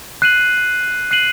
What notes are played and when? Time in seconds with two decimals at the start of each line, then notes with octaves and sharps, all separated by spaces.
0.22 F#6 C7 D#7 F#7
1.11 F#6 C7 D#7 F#7